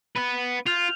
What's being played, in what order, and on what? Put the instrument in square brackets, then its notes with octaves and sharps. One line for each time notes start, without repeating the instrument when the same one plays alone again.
[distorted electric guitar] B3 B4
[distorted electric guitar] F4 [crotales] F6 G6 F7